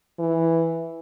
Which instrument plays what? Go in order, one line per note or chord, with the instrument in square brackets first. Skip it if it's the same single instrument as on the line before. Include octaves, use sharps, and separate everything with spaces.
[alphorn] E3